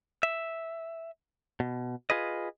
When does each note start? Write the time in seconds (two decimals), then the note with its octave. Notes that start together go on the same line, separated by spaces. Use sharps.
0.23 E5
1.60 B2
2.10 F4 G#4 B4 D#5